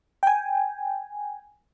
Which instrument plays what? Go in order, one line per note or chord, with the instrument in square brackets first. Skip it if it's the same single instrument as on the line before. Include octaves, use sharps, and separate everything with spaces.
[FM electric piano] G5 G#5